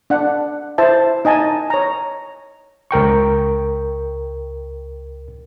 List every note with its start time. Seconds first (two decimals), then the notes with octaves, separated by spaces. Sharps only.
0.10 D4 F#5
0.78 E4 C5 E5 A5
1.25 D#4 D#5 G#5 A5
1.70 C#5 A#5
2.91 C#2 A#4 G5 C#6